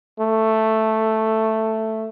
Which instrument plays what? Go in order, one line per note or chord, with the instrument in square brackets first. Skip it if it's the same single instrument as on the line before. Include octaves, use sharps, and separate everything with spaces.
[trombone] A3